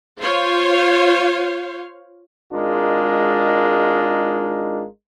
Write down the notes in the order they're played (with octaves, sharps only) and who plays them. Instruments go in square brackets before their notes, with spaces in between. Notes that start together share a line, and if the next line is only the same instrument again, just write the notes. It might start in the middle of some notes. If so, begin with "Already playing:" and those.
[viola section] F4 C5 C#5 F5
[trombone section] G#1 G#3 D4 D#4 F4 A#4